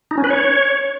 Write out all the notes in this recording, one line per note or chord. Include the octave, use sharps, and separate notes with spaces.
D#4
C#4
B4
C#5